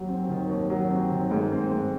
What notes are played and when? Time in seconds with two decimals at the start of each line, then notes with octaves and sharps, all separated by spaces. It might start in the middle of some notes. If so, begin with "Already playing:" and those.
Already playing: D#2 F#3
0.09 C4
0.29 D#3
0.49 D#2
0.70 F#3
0.90 C4
1.11 D#3
1.31 G#2
1.52 C4
1.72 G#2